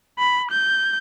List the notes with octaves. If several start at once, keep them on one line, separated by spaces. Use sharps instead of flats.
B5
G6